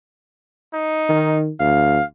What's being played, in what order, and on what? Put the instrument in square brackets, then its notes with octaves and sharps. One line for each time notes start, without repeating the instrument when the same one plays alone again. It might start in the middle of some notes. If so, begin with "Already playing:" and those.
[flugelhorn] D#4
[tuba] D#3
[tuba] D2 [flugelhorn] F5